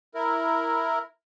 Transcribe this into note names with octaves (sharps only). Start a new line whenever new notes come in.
E4 A#4